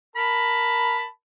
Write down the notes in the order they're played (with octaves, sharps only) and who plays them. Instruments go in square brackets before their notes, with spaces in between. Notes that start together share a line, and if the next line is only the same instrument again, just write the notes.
[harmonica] A#4 A5 B5